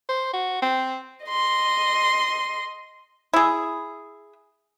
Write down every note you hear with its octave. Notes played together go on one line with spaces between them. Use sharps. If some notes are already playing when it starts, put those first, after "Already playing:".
C5
F#4
C4
D#5 C6
E4 G#4